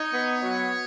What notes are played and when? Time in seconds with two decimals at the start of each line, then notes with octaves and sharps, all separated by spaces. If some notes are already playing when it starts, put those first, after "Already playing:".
Already playing: D#4 C#5
0.13 B3
0.43 F#3